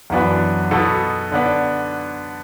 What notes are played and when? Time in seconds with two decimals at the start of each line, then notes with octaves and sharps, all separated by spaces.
0.10 F#2 E3 B3 D4 F#4
0.71 B2 B3 F#4 A4
1.32 D3 B3 D4